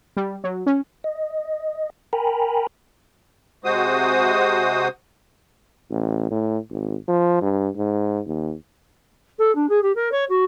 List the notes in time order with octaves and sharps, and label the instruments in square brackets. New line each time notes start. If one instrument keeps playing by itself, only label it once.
[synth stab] G3
F#3
C#4
[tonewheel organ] D#5
A#4 G5 G#5 A#5 B5
[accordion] C3 G#3 F#4 C5 D#6
[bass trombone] A1
A2
G#1
F3
G2
G#2
D#2
[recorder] A4
D4
G#4
G4
A#4
C#5
F#4